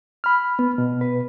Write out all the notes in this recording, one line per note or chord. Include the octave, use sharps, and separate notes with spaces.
B5 F6
B3
B2
B4